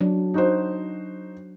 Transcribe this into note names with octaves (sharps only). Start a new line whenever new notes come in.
F#3 D4
D#4 F#4 C5